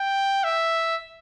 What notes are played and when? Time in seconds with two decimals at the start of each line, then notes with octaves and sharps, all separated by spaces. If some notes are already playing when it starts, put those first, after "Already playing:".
Already playing: G5
0.44 E5